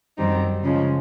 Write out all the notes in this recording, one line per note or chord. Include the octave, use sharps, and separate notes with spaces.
F#2 D#3 G3 C4 D#4
C#3 F3 G#3 C#4